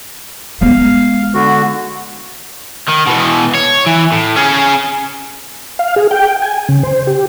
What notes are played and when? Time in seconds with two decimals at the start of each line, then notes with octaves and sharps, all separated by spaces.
0.61 G#3 B3 F5
1.34 D3 F#4
2.88 D#3
3.06 B2 E3
3.55 C#5
3.86 E3
4.12 A2
4.36 C#4 G#4
5.79 F5
5.96 G#4
6.11 G5
6.42 G#5
6.69 C#3
6.83 C5
7.07 G4